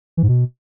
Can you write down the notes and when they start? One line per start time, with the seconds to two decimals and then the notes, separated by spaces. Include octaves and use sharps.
0.17 E3
0.23 G#2
0.29 B2